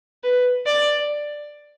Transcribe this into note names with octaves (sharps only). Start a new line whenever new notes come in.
B4
D5